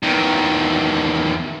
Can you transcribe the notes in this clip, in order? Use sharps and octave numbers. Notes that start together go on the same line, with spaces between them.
E2 D#3